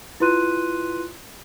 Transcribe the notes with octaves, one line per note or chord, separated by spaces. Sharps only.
E4 F4 B4 C6 F#6 D#7